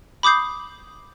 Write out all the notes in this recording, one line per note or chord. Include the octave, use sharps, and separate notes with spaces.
B5 D6 D#6 G6 C7